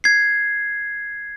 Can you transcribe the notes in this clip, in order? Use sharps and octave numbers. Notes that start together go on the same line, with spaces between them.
G#6 C7